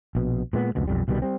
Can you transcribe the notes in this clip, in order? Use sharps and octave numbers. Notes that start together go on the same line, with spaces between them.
A#1 B2
A#2 G#3 B3
F1 C#2 B2
B1 F2 G3
C2 B2 D#3 G3
G3 C4